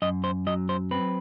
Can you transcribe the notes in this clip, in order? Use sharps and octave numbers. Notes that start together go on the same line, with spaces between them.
F#2 D#5
C5
F#3 D#5
C5
C4 B4